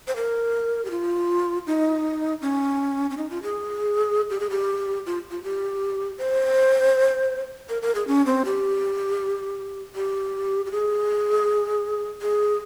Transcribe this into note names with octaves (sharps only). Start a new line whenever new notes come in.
C5
A#4
G4
F4
D#4
C#4
C#4
D#4
F4
G#4
G4
G#4
G4
F4
F4
G4
C5
A#4
A#4
G#4
C#4
C4
G4
G4
G4
G#4
G#4